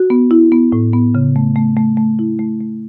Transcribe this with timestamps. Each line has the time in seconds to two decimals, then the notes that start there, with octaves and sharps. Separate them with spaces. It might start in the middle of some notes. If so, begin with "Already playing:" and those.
Already playing: F#4
0.10 B3
0.31 E4
0.52 B3
0.72 A2
0.93 B3
1.15 C#3
1.36 A3
1.56 A3
1.77 A3
1.97 A3
2.19 E4
2.39 A3
2.61 A3